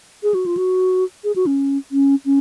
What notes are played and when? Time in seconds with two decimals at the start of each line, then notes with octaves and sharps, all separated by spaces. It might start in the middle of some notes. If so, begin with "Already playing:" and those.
0.23 G#4
0.34 F#4
0.46 F4
0.57 F#4
1.24 G#4
1.36 F#4
1.46 C#4
1.92 C#4
2.25 C#4